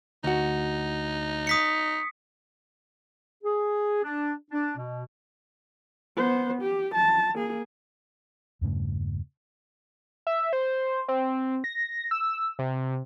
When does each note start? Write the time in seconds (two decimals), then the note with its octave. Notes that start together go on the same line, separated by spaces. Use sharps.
0.24 D2 D#4 F#4
1.47 D#6 B6 C#7
3.44 G#4
4.03 D4
4.51 D4
4.77 B2
6.17 B3 C5
6.62 G4
6.94 A5
7.35 A#3 G#4
8.61 E2 G2 C#3 A3
10.27 E5
10.53 C5
11.08 C4
11.64 A#6
12.11 E6
12.59 C3